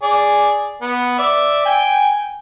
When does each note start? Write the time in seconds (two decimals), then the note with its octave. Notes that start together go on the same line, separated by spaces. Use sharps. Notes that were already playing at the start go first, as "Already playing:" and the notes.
0.02 G#4 D5
0.82 B3
1.19 D5 E5
1.66 G5 G#5